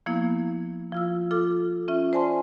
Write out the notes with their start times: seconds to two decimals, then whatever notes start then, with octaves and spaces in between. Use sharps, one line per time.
0.06 F3 A#3 B3 E4
0.92 F3 F4 E6
1.31 F4 A4 D6
1.88 C#4 F4 E5
2.13 C5 D5 G#5 A5 C6